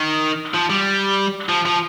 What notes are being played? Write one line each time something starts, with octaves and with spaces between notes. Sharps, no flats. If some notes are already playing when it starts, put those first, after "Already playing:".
Already playing: D#3
F3
G3
F3
F3